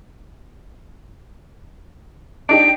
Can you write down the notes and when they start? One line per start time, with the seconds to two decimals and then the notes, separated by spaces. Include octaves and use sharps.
2.49 D4 D#4 G4 D7